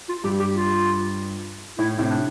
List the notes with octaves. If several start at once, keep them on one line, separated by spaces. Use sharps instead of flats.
F4
G2 G4
G4
F4
A2 E4
A2 C3
D4